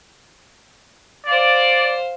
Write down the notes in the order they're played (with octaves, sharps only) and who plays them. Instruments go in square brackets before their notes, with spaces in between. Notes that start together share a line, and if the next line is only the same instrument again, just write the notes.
[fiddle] C5 F5 [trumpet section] D5